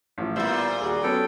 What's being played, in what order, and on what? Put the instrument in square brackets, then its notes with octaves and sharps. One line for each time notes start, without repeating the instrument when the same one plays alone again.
[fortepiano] A1 F3
[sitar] A#2 G3 [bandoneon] B3 C5 E6 [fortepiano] E4
[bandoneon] D#2 [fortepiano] F#4 G#4
[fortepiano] F#3 B3 C#4 [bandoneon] A4 G5